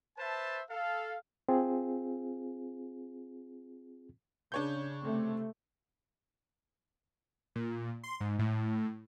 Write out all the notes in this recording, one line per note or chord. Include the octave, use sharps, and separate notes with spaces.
B4 C5 E5 A5
A4 F5
C4 F4 G#4
C#3 D4 C#5 G6
C3 A3 C4
A#2
C6
G#2
A2